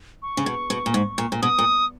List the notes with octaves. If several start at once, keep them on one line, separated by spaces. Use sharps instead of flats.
C#6
C#3
B2
B2
A#2
G#2
A#2
A#2
B2 D#6
A#2